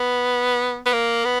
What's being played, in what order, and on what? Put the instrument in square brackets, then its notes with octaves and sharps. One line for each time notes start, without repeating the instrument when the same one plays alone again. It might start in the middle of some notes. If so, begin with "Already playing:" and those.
Already playing: [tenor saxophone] B3
B3
A#3
B3